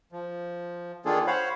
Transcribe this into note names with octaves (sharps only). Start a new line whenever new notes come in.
F3
D#3 A#3 D4 F4 G#4 A4
C5 C#5 F5 F#5 B5